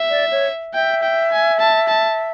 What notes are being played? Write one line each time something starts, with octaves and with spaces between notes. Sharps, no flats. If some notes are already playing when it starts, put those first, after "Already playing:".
Already playing: E5
D5
C#5
E5 G5
G5
G#5
A5
A5